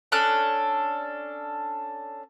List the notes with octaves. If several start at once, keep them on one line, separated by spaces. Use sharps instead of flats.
C#4 D4 A4 F#6